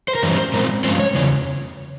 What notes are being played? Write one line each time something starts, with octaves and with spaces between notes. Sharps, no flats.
C5
A#4
G2 E3 G3 C#4 C5
C5
A#2 G#3 C4 A#4
G2 F3 G#3 C#4 C5
C#5
E2 C#3 C#5